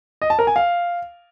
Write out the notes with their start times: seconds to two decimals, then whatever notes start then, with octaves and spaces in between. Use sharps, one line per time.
0.22 D#5
0.30 A5
0.39 A#4
0.47 G#5
0.56 F5